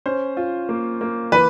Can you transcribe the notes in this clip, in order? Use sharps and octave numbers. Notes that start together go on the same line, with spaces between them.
C#4 C5
F4
A#3
A#3
E3 B4